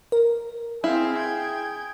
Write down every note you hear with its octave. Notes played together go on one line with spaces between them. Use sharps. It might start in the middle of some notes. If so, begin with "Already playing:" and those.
A#4
C4 E4 G#4 F5
G5 G#6